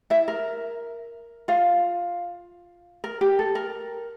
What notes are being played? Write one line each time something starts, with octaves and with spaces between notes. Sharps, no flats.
E4 E5
A#4
F4 F5
A#4
G4
A4
A#4